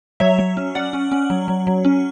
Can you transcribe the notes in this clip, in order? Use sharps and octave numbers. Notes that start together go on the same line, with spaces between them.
F#3 C#5 E5
F#3
C#4
C#4 D5 F#5
C#4
C#4
F#3
F#3
F#3
C#4